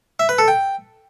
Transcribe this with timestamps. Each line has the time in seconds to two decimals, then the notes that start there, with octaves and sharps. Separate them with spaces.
0.19 E5
0.29 B4
0.38 A4
0.48 G5